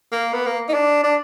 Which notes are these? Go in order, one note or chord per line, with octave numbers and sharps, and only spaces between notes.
A#3
B3
A#3
D#4
D4
D4